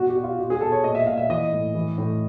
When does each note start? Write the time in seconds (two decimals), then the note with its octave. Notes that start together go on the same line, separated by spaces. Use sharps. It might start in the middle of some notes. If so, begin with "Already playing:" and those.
Already playing: B2 F#4
0.08 G4
0.15 B2
0.24 F4
0.38 B2 G4
0.50 G#4
0.61 B2 A4
0.72 C#5
0.84 A#2 D#5
0.95 E5
1.06 A#2 F5
1.17 E5
1.29 E3 D#5
1.52 A2
1.75 E3
1.98 A2